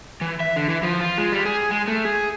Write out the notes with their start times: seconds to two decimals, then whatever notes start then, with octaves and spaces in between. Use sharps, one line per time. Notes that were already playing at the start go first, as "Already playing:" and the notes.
0.21 E3
0.40 E5
0.56 D3
0.68 E3
0.83 F3
1.00 F4
1.18 G#3
1.32 G3
1.46 G#4
1.71 G#3
1.88 A3
2.05 G#4